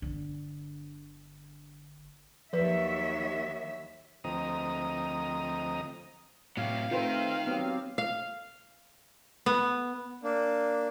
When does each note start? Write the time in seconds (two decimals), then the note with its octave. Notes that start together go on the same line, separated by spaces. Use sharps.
0.02 G1 D3
2.53 D#2 F3 F#3 B4 E5
4.24 D2 F3 C4 D#5 A#5 D#6
6.57 A2 C3 F#3 F5
6.91 D#3 A3 C4 D#4 F4 B4 C5
7.47 F#3 B3 C4 G4
7.98 F5
9.46 B3
10.23 A#3 D4